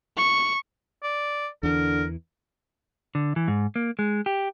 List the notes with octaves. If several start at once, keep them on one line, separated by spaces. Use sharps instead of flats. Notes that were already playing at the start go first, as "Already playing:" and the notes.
C#6
D5
E2 D3 E3 A#4
D3
E3
G#2
A#3
G#3
G4